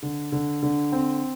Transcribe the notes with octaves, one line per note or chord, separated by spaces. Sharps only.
D3
D3
D3
C4